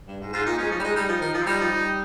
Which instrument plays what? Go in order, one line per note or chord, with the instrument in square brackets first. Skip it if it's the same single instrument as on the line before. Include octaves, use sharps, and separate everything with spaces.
[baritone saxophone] G2
G#2
[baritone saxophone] G#2 [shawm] F4
[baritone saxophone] A#2 [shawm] D#4
[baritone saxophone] G#3 [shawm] C#4
[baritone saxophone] F3 [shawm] D#4
[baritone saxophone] G3
[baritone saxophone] G#3 [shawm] D#4
[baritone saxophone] G3 [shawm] D#4
[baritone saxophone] F3
D#3
F3
[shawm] F4
[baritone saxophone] G3 [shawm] D#4
[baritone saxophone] F3
G3